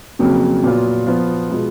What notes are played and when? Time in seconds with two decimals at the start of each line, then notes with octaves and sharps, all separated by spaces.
0.19 F2 C#3 F#3 A#3
0.63 A#2 F#3 B3 F4
1.07 F3 B3 F4
1.49 B2 G#3 B3 F4